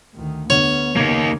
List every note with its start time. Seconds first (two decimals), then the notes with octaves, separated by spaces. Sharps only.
0.15 D2 D#3
0.50 D2 B3 C#5
0.96 F#1 D#2 A#3 D#4 G#6